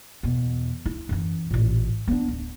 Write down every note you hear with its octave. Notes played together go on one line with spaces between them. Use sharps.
E2 B2
E4
F#2 E3
A1 A#2
B3 D4
D1